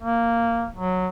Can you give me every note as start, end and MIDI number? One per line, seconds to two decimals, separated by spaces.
0.01 0.67 58
0.75 1.09 54